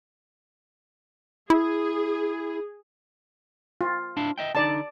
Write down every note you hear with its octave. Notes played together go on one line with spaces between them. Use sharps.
E4 G#4
F4
D4 E4 F5
D#5 E5 G5
D3 D#4 D5 A5